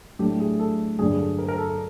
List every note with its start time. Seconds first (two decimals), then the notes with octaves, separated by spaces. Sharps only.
0.19 A2 F#3 A3 D4 G4
0.40 G#4
0.59 A4
0.99 G2 D3 F#3 G#4
1.11 G#4
1.19 A4
1.38 A#4
1.48 A#4
1.58 A4
1.69 A4